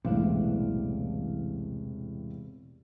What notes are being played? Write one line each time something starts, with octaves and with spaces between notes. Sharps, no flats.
E1 B1 A2 C3 E3 D4 F5